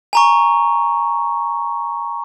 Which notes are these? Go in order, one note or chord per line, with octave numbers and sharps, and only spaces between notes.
G#5 A#5 C#6